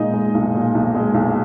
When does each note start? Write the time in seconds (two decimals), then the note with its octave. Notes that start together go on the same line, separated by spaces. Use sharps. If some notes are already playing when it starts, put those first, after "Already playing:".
Already playing: A#2 G#3 D#4 D#5
0.14 G#3
0.34 B1
0.54 A#2
0.75 B1
0.95 G#3
1.14 B1